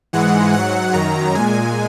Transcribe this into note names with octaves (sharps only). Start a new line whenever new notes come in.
G#2 E3 G#3 F#5
G#2 F#3 F#5
F#2 D#3 F#3 A#5
A#2 G#3 G#5